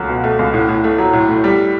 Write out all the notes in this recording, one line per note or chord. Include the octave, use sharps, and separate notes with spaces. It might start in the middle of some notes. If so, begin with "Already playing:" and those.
Already playing: C#2 F#3 A3
B2
A3
C#2
A2
A2
A3
F#3
A2
A2
G3